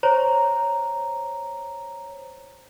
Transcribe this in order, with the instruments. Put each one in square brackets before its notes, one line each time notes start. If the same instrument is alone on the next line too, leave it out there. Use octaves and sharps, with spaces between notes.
[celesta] C5 C#5 A#5